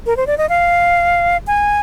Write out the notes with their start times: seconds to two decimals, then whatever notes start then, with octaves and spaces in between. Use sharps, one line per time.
0.06 A#4
0.17 C5
0.27 D5
0.38 D#5
0.49 F5
1.47 G#5